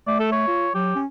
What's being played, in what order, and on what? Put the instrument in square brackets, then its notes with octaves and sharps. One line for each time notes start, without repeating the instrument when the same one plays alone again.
[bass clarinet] A3 [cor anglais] D5
[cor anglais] A4
C#5
[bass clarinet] F4
[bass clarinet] F#3 [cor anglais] G4
[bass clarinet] C#4